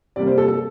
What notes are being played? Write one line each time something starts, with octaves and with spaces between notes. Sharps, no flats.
C3 G3 A#3 D5
C5
A4
A4